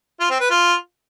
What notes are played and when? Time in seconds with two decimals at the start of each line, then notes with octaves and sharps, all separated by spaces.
0.20 F4
0.30 C4
0.40 B4
0.50 F4